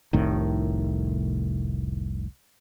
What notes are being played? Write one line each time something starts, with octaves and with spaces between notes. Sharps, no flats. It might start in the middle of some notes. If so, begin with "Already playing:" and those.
F1 C2 A2 D#3